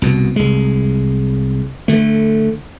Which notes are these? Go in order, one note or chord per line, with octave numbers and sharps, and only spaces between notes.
C2 B2
C2 G#3
D3 A3